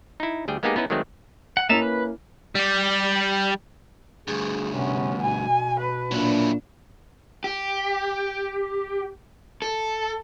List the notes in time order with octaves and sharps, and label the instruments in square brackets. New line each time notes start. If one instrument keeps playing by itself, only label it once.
[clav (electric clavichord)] D#4 E4
D2 G3 G#4 G5
G#3 A#3 B3 D#4 G4 G#4
B3 C#4 D#4 E4 B4
D#3 F#3 G#3 A3 C4
[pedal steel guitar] F#5
[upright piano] A#3 C#4 E4 [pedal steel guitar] D#4 E5 A5
[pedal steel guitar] B4
[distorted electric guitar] G3 G4
[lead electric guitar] D2 G2 [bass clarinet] G#4
[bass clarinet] C3 [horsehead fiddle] B3 C#4
[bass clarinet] B2 [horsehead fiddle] G#5
[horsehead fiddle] B4
[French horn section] A#2 A#3 D4 [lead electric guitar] F#3 E4
[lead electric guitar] G4
A4